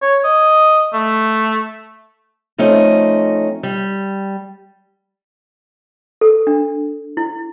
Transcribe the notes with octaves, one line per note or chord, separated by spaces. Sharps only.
C#5
D#5
A3
F3 A3 C4 C#4 D#4
G3
A4
D4
E4